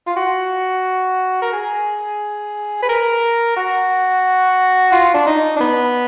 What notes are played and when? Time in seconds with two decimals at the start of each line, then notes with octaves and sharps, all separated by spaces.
0.07 F4
0.16 F#4
1.42 A#4
1.53 G#4
2.83 B4
2.89 A#4
3.56 F#4
4.92 F4
5.14 D4
5.27 D#4
5.56 D4
5.60 B3